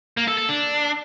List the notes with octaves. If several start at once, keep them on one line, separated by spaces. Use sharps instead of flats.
A#3
A4
A4
D4